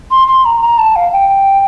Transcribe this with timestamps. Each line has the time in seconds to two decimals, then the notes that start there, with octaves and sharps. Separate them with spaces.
0.11 C6
0.28 C6
0.45 A#5
0.62 A#5
0.78 A5
0.96 F5
1.13 G5